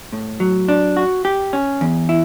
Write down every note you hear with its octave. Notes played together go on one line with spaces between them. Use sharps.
A2
F#3
D4
F#4
G4
C#4
E2
E4